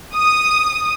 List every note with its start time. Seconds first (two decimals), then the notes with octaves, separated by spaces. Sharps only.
0.15 D#6